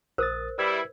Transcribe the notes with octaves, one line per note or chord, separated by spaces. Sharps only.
A#1 A#4 C5 D#6 A6
G3 E4 B4 E6 G#6